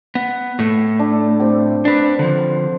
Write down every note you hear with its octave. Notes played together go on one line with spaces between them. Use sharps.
B3
A2 A3
D4
C4 G4
D4 B4
D3 F3